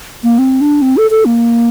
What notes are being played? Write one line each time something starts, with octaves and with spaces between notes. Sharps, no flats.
A#3
C4
D4
C4
A4
A4
A#3